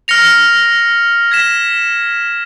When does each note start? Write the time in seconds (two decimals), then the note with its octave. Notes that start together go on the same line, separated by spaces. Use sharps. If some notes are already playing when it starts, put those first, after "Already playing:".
0.08 F6 A#6 C#7 F7
1.31 G#6 B6 E7